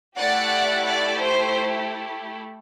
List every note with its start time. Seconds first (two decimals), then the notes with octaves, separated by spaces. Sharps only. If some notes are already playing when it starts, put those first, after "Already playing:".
0.18 A3 E4 G4 D5 F#5
0.87 D5
1.22 C5